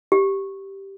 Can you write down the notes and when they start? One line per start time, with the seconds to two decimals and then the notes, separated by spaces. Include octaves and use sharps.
0.12 G4